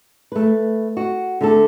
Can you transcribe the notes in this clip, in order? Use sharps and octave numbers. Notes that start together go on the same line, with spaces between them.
A3 B4
F#4
D3 A3 A4